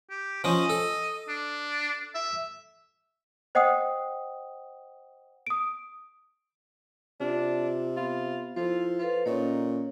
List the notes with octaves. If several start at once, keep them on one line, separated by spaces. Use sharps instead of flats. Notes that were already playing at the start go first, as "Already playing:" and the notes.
G4
F3 C#4 D#5
A4
D4
E5
C5 D#5 F#5 G5 D#6
D#6 D7
C3 D4 F4
B3 F4
F3 E4 F4 A4 C5
F4 A4 B4 C5
A#2 C#4 D#4 A4 C#5